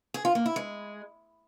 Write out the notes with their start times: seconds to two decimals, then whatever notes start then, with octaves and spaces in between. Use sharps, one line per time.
0.14 G#4
0.25 F4
0.35 A#3
0.46 E4
0.56 G#3